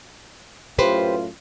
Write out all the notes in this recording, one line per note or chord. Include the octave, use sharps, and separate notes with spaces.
F#2 A2 F4 G4 B4 C5